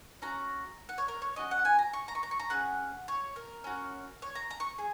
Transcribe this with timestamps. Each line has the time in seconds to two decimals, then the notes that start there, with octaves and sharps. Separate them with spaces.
0.22 C#4 F#4 A#5
0.89 F#5
0.98 C#5
1.08 A#4
1.22 C#5
1.36 C#4 F#4 D#5
1.51 F#5
1.65 G#5
1.79 A#5
1.93 C#6
2.08 A#5
2.15 C#6
2.23 A#5
2.31 C#6
2.40 A#5
2.50 C#4 G#4 F#5
3.08 C#5
3.36 A#4
3.64 C#4 F#4
4.22 C#5
4.35 A#5
4.50 A#5
4.60 C#6
4.78 G#4